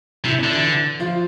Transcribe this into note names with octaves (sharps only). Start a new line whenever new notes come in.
C3 E4
D3 D4
E3 E4
F3 F4